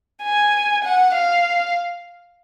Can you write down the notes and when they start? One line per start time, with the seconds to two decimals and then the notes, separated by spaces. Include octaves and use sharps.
0.23 G#5
0.84 F#5
1.15 F5